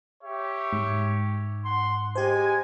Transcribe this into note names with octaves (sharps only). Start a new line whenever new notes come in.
G4 C#5 E5
G#2
F#5 C6
G#3 G4 C5 G#5